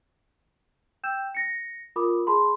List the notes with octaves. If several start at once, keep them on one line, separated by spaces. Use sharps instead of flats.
G5 E6 G6 E7
A#6 C#7
F4 A#4 B5 D6 D#6
G#4 A5 B5 C6